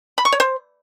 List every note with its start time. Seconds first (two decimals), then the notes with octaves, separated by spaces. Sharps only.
0.18 B5
0.25 C#6
0.32 C#5
0.40 C5